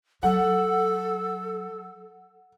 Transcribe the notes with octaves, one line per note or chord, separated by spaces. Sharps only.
F#3 A4 F#5